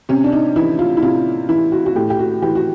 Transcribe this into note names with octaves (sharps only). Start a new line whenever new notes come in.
C3 C#4
D4
D#4
E3 E4
F4
E4
C3 F4
E3 E4
F#4
F#4
A2 G4
G4
F#4
E3 G4
F#4